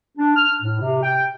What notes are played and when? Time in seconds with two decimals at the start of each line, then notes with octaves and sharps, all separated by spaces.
0.18 D4
0.36 F6
0.62 A2
0.81 C3
1.03 G5